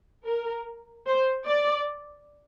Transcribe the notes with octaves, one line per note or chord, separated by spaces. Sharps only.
A#4
C5
D5